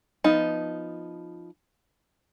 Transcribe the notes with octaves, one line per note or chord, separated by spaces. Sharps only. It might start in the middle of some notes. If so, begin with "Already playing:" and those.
F3 B3 D#4